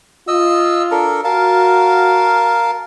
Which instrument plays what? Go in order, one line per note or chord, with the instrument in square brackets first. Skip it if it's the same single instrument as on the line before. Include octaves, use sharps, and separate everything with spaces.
[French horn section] F4 [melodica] D#5 E6
[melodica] D4 A4 A#4
[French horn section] F#4 [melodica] A#4 F5 A5